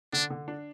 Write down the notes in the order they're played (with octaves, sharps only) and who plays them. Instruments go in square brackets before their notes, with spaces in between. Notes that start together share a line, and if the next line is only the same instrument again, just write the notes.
[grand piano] D3 [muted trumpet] D4
[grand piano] D3
D4